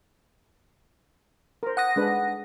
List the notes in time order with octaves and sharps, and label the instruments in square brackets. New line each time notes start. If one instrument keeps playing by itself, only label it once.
[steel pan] A#4 C5
[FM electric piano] F#5 D#6 A#6
[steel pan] G#3 D4 B4